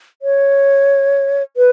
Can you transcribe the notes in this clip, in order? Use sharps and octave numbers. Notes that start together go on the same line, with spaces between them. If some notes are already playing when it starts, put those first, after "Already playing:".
C#5
B4